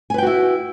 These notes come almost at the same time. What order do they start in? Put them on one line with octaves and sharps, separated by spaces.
G#5 B4 G5 F#4 E4